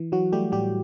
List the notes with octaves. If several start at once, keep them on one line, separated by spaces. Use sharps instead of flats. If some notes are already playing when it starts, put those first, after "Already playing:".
Already playing: E3
E3 F#3 F#4
G3 A3 G4
A2 G3 G4